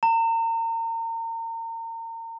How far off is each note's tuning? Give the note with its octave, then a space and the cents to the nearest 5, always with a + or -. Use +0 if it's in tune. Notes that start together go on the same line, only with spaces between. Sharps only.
A#5 -35